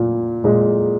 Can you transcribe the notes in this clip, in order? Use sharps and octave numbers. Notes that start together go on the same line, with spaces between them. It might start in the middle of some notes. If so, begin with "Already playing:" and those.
Already playing: A#2
A#2 G#3